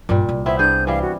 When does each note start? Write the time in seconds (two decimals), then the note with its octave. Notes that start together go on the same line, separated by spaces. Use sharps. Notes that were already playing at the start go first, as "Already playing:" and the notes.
0.09 A#1 G2 A#2 G3
0.29 C2
0.46 B3 C4 E4 E5
0.59 G2 G#4 G6
0.87 E3 G3 F5
1.02 F#4